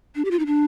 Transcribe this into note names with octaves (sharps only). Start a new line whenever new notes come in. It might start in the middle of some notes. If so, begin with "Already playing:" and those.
D4
G4
F4
D#4
D4